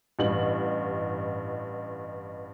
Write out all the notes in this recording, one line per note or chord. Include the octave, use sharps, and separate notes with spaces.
A1 G2 F#7